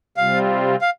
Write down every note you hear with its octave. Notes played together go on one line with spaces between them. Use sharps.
C3 G3 C4 F4 F5
F5